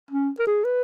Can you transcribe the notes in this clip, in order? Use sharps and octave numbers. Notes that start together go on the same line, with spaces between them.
C#4
A#4
G#4
B4